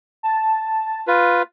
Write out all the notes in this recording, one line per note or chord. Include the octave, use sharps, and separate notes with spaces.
A5
F4 B4